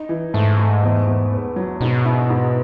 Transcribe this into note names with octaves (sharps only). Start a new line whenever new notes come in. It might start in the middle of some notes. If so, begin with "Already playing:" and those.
Already playing: D#4
E3
G#2 A3
A3
E2
E2
B3
F#3
G#2 B2
E4
G#2